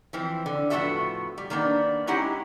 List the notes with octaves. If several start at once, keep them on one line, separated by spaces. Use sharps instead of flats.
E3 F3 C4
D3
A2 F3 B3 F#4 A4 E5
G3
D#3 A#3 B3 D4
G#3 C#4 D#4 E4 G4 F#5